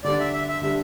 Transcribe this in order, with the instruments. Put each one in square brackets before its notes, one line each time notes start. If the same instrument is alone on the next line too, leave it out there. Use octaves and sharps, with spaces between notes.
[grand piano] D3 G3 D4 [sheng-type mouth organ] D5
[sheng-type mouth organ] E5
E5
E5
[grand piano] D3 G3 D4 [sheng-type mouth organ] E5